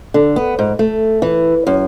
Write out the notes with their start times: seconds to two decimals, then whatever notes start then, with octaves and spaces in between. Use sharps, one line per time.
0.14 D3
0.36 B3
0.59 G#2
0.79 A3
1.22 E3
1.67 F#2